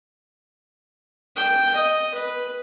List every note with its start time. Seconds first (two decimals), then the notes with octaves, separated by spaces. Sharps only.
1.36 G5
1.74 D#5
2.14 B4